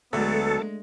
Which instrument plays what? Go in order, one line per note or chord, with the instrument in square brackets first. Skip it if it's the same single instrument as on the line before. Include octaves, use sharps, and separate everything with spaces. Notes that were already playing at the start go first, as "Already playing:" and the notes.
[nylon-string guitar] D2 [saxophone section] F#3 A3 B3 [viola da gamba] G#3 [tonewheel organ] A4